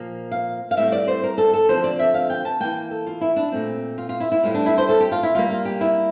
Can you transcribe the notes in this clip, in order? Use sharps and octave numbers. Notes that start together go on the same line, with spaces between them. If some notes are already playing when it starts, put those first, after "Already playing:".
Already playing: A#2 F3 A#3
F5
F5
A2 G3 C4 E5
D5
C5
A#4
A4
A4
D3 F3 C4 C5
D5
E5
F5
G5
A5
E3 A#3 G5
A4
F4
E4
D4
A#2 A3 C4
F4
F4
E4
E4
A2 G3 C4 F4
D4
E4
C5
A4
G4
F4
E4
D3 G3 A#3 F4
F4
G4
E4